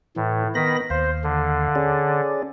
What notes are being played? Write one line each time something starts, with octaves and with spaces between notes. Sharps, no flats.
A2 E3
D#3 B3 B5 A#6
D#2 C5 F5
D3
C#4 G#4 D5